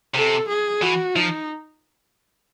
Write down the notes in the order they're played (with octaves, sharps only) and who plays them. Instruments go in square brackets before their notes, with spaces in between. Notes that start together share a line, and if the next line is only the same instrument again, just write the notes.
[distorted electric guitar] C3 [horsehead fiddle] A4
[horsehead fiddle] G#4
[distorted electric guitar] E3 [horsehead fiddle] F#4
[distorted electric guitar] F3 [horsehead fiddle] D#4